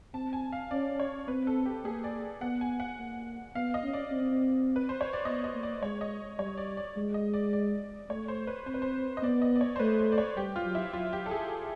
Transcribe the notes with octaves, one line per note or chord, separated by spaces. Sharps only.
C4 A5
G#5
F5
C#4 D5
C#5
C4 B4
A4
G4
A#3 G#4
D5
B3 F#5
G#5
F#5
A#3
B3 F5
D#5
C#4
D5
C4
B4
C5
C#5
D5
B3 D#5
D#5
A#3
D5
G#3 C#5
D#5
G3 C#5
D5
D5
G#3
D#5
D5
D5
A3 C#5
C5
B4
C4 C5
B4
C5
D#5
B3 D5
D#5
D5
C#5
C5
A3 B4
C5
D5
C#5
G3 G4
F4
F#3
E4
F#3 F4
G4
A4
G#4